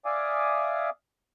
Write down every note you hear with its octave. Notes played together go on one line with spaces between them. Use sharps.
D5 E5 F5 G#5 D6 D#6